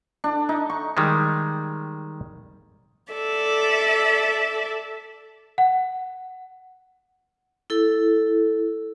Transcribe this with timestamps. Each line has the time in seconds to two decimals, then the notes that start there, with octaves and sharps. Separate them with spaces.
0.24 D4
0.49 D#4
0.70 C#6
0.97 D#3 G3 G#3
3.12 A4 D5 E5
5.58 F#5
7.70 E4 A4